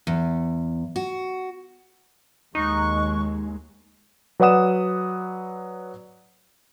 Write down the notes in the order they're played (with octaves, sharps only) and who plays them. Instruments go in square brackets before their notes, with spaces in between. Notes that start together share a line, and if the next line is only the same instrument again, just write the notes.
[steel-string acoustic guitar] E2
F#4
[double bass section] D#2 G#3 [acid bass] D#4 [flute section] C#6 F#6
[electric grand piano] F#3 B4 D5 F#5 D#6 E7